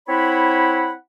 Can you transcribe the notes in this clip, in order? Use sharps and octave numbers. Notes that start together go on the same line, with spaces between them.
C4 E4 C#5 F#5 B5